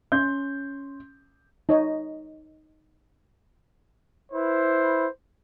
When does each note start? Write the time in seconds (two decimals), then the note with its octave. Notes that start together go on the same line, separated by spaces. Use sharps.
0.12 C#4 C6 G6
1.69 D#4 C#5 D#5
4.32 E4 B4 C5